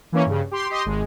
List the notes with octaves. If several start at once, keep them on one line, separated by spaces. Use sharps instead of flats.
E3 A#3 C#4 C#5
G2 C#3
G4 C6
G4 D#5 C6
G#1 G#3